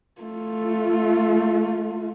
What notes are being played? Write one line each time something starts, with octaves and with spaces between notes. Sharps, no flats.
A3 F4